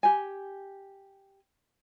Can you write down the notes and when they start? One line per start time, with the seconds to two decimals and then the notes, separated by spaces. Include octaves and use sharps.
0.03 G4 G#5